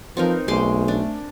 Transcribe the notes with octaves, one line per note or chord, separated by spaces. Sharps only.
F3 C4 D#4 A#4 B4
B1 G#3 A3 C6 D6
D4